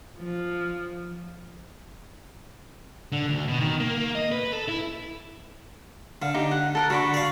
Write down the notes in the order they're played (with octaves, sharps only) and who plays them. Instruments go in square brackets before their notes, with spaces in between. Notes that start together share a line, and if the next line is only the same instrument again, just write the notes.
[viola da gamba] F3
[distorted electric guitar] D3
D2
B2
D#3
A#3
A#3
D#5
B4
A4
E4
[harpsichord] D3 [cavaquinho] F5
[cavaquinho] D#4 G4
F#5
A4 A#4 F#5
[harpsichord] D3 [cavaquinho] F#4 B5 C#6
[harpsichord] D5 F5